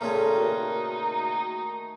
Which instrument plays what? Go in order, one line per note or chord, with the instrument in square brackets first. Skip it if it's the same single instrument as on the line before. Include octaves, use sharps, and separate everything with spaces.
[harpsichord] A#2 C#3 C4 [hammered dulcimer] A3 G#5 [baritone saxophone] D#4
[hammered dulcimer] D#3 [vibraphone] F#4 A#4 E5